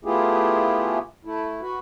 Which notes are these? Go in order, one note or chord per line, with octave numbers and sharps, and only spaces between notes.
A3 B3 E4 F4 G4 G#4
A3 E4
F#4 B4